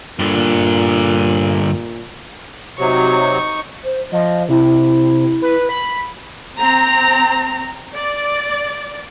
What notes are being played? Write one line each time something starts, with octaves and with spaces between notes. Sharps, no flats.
G2 A#2 D3
C3 F#3 D#4 C#6
C5
F3 D#5
C3 E4
B4
B5
C4 A#5
D5